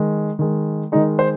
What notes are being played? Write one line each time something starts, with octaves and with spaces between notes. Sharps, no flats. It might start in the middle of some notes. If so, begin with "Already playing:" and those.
Already playing: D#3 G#3
D#3 G#3
D#3 G#3 D#4
C5